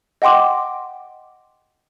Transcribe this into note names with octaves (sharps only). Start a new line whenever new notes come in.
D#5 F#5 G5 C6 D6